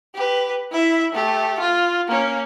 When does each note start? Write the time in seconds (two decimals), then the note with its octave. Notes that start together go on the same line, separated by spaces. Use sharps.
0.14 G4 B4
0.72 E4 E5
1.12 A3 G4
1.59 F4
2.08 A#3 C#4